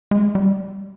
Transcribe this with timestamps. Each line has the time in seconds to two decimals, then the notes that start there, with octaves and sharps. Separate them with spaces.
0.11 G#3
0.35 G3